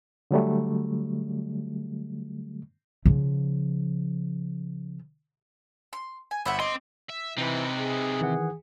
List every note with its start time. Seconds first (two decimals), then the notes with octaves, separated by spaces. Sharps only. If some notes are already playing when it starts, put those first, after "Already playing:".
0.31 D3 F#3 G3 A3
3.06 C#3 F3
5.93 C6
6.31 G#5
6.45 G1 C5 E5 F#5 B5 E6
6.60 C4 D#5 C6 D6
7.09 E5
7.38 C3 E3 D#4 B4
7.77 G#4
8.21 D#3 E3 F#5